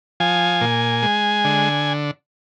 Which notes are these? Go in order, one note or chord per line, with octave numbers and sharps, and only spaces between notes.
F3 G#5
A#2
G#3
D3